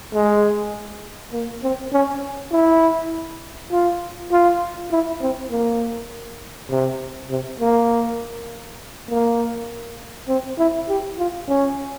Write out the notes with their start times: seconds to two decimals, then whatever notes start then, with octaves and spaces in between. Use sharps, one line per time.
0.14 G#3
1.33 A#3
1.63 C4
1.93 C#4
2.52 E4
3.72 F4
4.32 F4
4.91 E4
5.21 C4
5.51 A#3
6.71 C3
7.30 C3
7.60 A#3
9.10 A#3
10.29 C4
10.59 E4
10.89 G4
11.18 F4
11.48 C#4